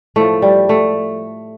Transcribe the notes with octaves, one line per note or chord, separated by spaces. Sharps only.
A2 F3 A3
G3
A3